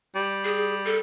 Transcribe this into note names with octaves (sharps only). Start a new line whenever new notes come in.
G3
G#4
A4